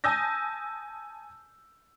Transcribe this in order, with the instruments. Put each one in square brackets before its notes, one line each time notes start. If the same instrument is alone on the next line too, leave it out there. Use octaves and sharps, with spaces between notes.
[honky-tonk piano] G#5 A5 D#6 E6 G6 A#6